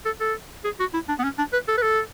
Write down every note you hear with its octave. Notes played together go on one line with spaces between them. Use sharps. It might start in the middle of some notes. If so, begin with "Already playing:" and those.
A4
A4
G#4
F#4
E4
D4
B3
C#4
D4
B4
A4
B4
A4